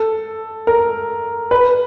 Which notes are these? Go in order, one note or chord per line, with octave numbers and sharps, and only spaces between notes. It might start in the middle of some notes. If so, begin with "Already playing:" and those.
Already playing: A4
A#4
B4